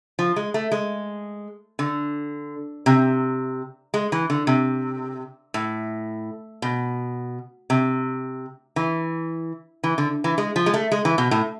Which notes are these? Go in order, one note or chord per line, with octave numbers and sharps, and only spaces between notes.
F3
G#3
A3
G#3
D3
C3
G#3
E3
D3
C3
A2
B2
C3
E3
E3
D3
E3
G#3
F3
G#3
A3
G#3
E3
B2
A2